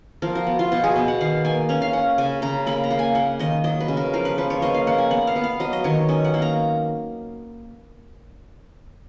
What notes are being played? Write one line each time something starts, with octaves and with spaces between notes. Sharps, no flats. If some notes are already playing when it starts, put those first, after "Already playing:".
F3 A#4
F#4
B3
F4
B2 F#4
G#4
B2
F#5
D#3 F5
A#3 G#5
C#4 A#5
F5
C#4 F#5
C#3 G#5
C#3 A#5
A#3 B5
A#5
A#3
G#5
A#3 F#5
D#3 D#5
F#3 D#5
B4
C#3
A#4
F3 A#4
B4
F3 B4
C#5
A#3 D#5
F5
A#3 F#5
G#5
B3 F#5
F5
B3
F5
F#3 D#5
D#5
D#3 C#5
C#4 D#5
F#5
A#3
A#5